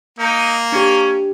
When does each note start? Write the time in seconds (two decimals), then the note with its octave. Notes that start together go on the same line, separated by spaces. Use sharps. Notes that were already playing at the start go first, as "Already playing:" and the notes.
0.19 A#3 D#4
0.72 C#4 D4 G4